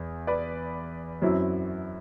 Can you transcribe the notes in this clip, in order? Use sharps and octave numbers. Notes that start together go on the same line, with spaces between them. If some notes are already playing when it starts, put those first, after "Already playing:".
Already playing: E2
B4 D5
F#2 F#3 C4 E4